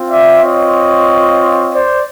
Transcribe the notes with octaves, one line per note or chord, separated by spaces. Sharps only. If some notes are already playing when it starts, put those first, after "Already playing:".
Already playing: C4 F4
D5 E5
C#5 D#5
C5 D5